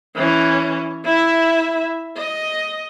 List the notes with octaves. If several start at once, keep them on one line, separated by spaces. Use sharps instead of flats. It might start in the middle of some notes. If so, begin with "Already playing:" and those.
E3 C#4
E4 E5
D#5